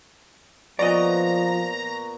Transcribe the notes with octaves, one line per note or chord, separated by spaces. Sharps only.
A#2 F3 B3 D5 D#5 A#5 C#6